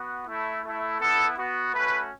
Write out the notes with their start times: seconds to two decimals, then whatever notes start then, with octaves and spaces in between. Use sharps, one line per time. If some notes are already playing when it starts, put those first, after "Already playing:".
Already playing: B3 F#4
0.27 A3 E4
0.63 A3 E4
1.00 B3 E4 A4
1.37 B3 F#4
1.74 A3 C#4 F#4 B4